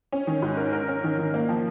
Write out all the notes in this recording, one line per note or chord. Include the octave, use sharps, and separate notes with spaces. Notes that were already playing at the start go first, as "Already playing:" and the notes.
C#4
D#3
G#2
A#4
A#4
C#4
D#3
D#3
A#3
F3